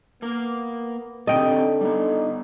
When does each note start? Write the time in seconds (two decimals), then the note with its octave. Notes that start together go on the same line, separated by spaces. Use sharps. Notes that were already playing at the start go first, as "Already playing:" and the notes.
0.22 A#3 B3 A#4
1.27 D3 C4 D#4 G4 A4 D#5 G5
1.81 G3 B3 D#4